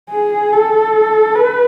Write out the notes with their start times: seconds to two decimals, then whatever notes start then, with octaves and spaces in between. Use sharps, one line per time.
0.10 G#4
0.52 A4
1.35 B4